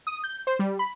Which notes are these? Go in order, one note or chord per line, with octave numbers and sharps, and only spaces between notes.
D#6
G6
C5
G3
B5